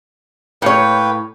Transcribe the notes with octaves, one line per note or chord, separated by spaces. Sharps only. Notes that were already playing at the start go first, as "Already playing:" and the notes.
A2 A#3 B4 C#5 G5